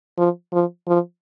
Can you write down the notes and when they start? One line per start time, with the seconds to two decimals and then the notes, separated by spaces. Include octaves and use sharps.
0.18 F3
0.53 F3
0.88 F3